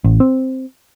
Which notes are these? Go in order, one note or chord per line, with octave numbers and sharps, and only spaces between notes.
A1
C4